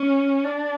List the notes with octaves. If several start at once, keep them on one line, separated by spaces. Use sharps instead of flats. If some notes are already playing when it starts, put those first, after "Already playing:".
Already playing: C#4
D4